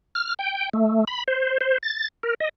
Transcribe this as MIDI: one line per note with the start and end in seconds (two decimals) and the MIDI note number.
0.15 0.34 89
0.39 0.69 79
0.73 1.05 57
1.08 1.24 83
1.28 1.58 72
1.61 1.78 72
1.83 2.08 93
2.23 2.34 70
2.40 2.49 75